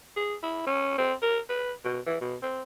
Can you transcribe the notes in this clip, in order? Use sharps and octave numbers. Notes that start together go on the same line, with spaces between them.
G#4
E4
C#4
C4
A#4
B4
B2
E3
B2
C4